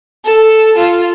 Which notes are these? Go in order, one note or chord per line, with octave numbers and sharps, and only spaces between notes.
A4
F4